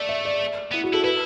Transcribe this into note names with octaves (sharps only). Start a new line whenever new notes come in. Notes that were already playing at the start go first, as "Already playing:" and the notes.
Already playing: A3 D5
E5
D5
B3 E4
F#4
E4 A4
E4 B4